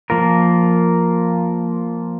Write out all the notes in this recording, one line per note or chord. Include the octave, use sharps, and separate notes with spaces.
F3 A#3 F4 A#4